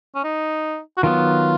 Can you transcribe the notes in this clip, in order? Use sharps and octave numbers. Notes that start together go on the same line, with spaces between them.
C#4
D#4
F#4
D#3 F#3 B3 F4